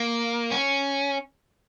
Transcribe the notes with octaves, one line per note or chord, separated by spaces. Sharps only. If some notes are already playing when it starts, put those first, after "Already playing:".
Already playing: A#3
C#4